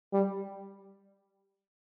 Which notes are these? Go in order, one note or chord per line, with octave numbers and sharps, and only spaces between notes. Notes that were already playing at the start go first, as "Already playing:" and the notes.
G3